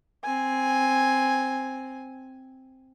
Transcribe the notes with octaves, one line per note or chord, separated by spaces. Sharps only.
C4 G#5